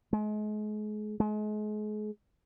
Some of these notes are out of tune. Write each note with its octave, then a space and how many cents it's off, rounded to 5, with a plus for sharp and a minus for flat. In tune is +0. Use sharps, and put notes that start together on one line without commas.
G#3 +35
G#3 +35